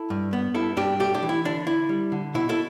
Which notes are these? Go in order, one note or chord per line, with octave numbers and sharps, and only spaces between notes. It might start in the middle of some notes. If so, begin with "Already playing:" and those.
Already playing: E4 A4
G2
B3
G2 E4 A4
G2 D4 G4
A3 D4 G4
D4 G4
E3
E4
D3 D4
D3 E4
G3
D3
B2 E4
E4 A4